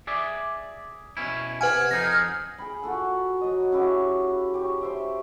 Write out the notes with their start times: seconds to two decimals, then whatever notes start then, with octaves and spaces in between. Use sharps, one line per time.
0.07 G#4 D5 E5
1.17 B2 C#4 E4
1.61 C3 B4 F#5 G#5 F6 G#6
1.91 F2 D#4 G#4 A#6
2.58 G#4 G5 B5
2.82 F4 F#4 A4 F#5
3.41 F#3 D#5
3.72 C#3 E4 F#4 G4
4.54 G4 C#5
4.81 C5 E5 G5